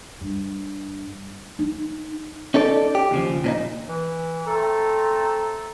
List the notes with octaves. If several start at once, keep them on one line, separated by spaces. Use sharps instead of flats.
G2
D#4
C#4 D#4 A4 C#5 D5
G4
D#2 C#3 F3
A#2 C#4 D#4
E3
A3 C4 A4 A#5